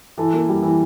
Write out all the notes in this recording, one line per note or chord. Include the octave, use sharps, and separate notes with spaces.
E3 A4
A#3
G3
E3